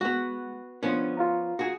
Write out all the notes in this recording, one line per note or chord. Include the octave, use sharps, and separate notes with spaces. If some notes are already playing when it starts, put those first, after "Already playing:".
G#3 B3 F#4
F3 B3 C#4 D4
F4 F5 A#5
F#4 G#4